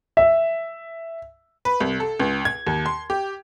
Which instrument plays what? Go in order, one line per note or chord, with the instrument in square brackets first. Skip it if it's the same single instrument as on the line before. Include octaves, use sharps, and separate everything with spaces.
[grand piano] E5
[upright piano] B4
C2
A4
C#2
G#6
D#2
C6
G4